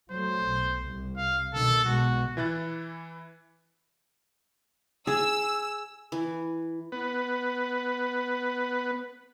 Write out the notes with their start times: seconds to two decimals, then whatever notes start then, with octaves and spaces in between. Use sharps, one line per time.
0.11 F#3 A3 C5
0.43 B1
0.85 C2
1.17 F5
1.54 B2 D#3 A4
1.85 B1 B2 G#3 F#4
2.37 E3 E4 F#6 A6
5.07 G#4 E6
6.12 E3
6.92 B3 B4